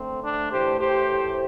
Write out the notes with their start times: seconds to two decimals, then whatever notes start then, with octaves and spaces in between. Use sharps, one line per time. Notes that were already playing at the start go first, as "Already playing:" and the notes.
Already playing: D3 A3 C4
0.24 D4
0.52 A2 E3 A3 G4 C5
0.80 G4 C5